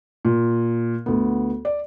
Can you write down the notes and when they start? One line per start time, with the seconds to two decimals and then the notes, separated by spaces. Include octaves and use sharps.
0.25 A#2
1.06 D2 B3
1.65 D5